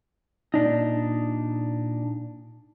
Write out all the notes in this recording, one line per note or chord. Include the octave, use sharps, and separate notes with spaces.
A#2 D4 D#4